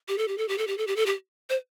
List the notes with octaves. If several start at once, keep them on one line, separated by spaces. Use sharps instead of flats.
G4
A4
G4
A4
G4
A4
G4
A4
G4
A4
G4
C5